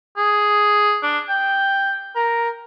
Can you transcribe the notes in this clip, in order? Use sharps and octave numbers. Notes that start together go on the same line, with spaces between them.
G#4
D4
G5
A#4